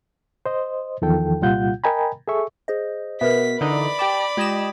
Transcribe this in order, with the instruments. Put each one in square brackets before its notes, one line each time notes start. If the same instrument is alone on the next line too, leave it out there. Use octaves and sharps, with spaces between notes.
[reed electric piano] C5 D#5
E2 D#3 F3 A4 G5
C2 A#2 G3 F4 F#5 G6
A#4 D#5 G5 G#5 A#5 B5
G#4 A4 E5 C#6
[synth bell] G#4 C5 D#5
[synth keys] B2 [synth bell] A#4 B4 E5 [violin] B6
[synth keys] D3 E3 D#4 [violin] D5 B5
[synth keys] G4 G5 A5 [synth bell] D6
[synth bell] G#3 F4 G#6 [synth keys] G4 D#5 E7